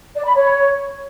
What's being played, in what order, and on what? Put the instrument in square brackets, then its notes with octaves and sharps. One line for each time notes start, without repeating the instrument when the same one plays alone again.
[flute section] D5
B5
C#5